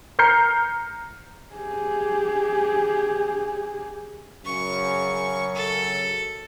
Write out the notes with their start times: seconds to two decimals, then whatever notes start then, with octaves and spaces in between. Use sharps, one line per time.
0.19 A#5 F6 G6 C7 C#7
1.55 G4 G#4
4.45 F#2 C#3 C#6
5.55 A4